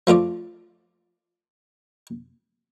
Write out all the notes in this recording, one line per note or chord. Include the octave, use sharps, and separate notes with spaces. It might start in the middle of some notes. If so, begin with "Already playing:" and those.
F3 A3 F4 D5